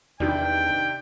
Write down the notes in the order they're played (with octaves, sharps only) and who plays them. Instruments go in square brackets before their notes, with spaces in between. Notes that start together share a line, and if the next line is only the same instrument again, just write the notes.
[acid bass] E2 [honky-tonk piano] C3 D#3 D4 [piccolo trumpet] G5